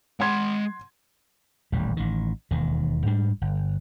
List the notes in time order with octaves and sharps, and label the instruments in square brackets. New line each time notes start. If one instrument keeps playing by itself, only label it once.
[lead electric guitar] G#3 B5 [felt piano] F#5 C6 G#6
[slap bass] D#1 A1 E2 G3
A1 D#3
E1 D#2 D#3
G#2 G3 D4
G1